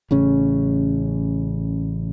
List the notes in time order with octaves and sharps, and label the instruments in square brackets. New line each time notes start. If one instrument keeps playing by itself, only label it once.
[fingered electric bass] A1 C#3 C#4